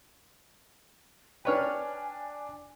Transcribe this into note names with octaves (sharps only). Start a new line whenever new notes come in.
D4 B4 C#5 D5 G5 G#5 F6